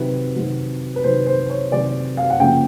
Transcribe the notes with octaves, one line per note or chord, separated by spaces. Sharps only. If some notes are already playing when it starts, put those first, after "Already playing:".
Already playing: C3 D#3 F#3 B4
C3 D#3 F#3
B4
C3 D#3 F#3 C5
C5
C#5
C3 D#3 F#3 D5
F5
F#5
C#3 F3 A#3 G5